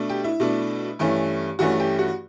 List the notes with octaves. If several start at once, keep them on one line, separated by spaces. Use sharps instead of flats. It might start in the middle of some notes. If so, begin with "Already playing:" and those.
Already playing: B2 A3 D4
G4
E4
B2 A3 D4
G2 E3 A3 C#4
G2 E3 A3 C#4 F#4
G4
F#4